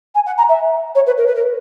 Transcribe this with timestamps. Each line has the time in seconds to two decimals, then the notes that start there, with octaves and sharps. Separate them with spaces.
0.15 G#5
0.26 F#5
0.38 A#5
0.49 E5
0.95 C#5
1.07 B4
1.17 A#4
1.27 B4
1.35 A#4